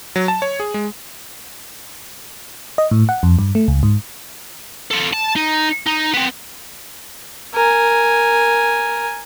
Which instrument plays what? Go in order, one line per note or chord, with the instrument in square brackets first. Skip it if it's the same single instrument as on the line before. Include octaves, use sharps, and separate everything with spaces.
[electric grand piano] F#3
A5
C#5
G#4
G#3
[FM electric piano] D#5
A2
F#5
F2
G2
A3
C#2
G#2
[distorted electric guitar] F4 A4
A5
D#4
D#4
B3 C4
[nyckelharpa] A#4 G#5